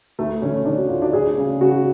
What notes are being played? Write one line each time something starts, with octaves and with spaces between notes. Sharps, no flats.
D2 A3
D3 C#4
D3 D4
F#4
D2 F4
D4
D2 G#4
C#3
C#3 F#4